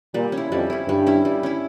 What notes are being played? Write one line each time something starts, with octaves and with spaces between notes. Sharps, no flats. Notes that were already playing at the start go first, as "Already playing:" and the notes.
A#2 G3
C#4
E4
F2 G3
C#4 E4
G2 G3
C#4 E4
G3
C#4 E4